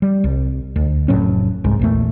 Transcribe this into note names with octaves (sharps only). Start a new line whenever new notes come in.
G3
C2
D2
F1 A2 F#3 C#4
C2 G#2
A#1 E2 A3